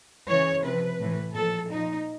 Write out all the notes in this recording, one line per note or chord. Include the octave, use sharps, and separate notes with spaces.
C#3 E3 C#5
C3 F3 B4
A2 E3
A#2 F3 A4
A#2 F3 D#4